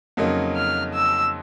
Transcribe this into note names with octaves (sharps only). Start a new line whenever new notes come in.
F2 C#3 F#3 A#3 D#4
F6
E6